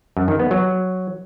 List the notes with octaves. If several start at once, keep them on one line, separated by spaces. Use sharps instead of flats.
F#2
D#3
B3
F#3